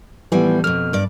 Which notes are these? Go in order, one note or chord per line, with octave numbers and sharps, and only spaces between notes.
A2 E3 F3 G3 B3
F2 B2 F6
G2 D5